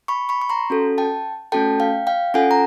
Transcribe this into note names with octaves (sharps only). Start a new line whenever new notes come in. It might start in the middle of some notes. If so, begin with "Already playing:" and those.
B5 C#6
B5 C#6
C#6
A#5 C6
C#4 F#4 A4
G5 A5
A3 C#4 F#4 A4 G5 A5
F5 G5
F5 G5
C#4 F4 A4 F#5 G#5
A#5